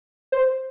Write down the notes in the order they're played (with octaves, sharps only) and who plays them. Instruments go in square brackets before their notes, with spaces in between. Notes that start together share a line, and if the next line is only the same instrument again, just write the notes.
[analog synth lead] C5